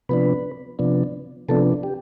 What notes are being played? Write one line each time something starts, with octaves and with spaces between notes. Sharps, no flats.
C3 F3 B3 D4 B4
C3 F3 B3 D4
C3 F3 B3 D4 A4
G4